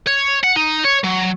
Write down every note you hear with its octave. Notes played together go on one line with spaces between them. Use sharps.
C#5
F#5
D#4
C#5
F#3